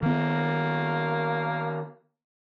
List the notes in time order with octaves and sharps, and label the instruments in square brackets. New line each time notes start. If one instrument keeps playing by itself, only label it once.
[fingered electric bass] D#3 B3 [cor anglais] A#3